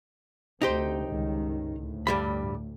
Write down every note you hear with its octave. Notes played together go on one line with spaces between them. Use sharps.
D2 C3 D#4 G4 C5
C#2 G2 D#3
D2 A2
G2 G3 B5